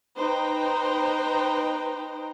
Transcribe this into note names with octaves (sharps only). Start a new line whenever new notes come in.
D#4 B4 C5 G5 A#5